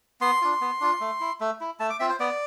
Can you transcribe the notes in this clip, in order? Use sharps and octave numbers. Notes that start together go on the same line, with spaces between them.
B3 C6
D4 F4
B3
D4 F4
A3
E4
A3
E4
A3 A5
D6
C4 F4 E5
C5
B3 D5